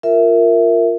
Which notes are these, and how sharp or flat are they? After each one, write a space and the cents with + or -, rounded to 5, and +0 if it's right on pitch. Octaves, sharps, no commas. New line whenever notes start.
F4 +0 A#4 -10 E5 +0